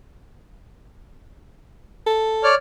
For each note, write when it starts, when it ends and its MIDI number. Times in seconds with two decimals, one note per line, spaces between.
2.06 2.51 69
2.43 2.55 73
2.43 2.55 74
2.43 2.55 89